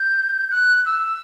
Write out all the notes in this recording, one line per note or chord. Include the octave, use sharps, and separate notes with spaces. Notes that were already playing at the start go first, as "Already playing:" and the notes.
Already playing: G6
F#6
E6